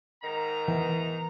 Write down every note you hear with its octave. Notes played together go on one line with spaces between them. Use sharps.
G#2 D#3 A#5
E3